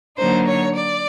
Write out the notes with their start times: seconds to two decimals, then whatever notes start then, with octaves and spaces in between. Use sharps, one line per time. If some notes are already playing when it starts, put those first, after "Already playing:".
0.17 D3 F#3 A#3 D#4 C5
0.47 C#5
0.76 D5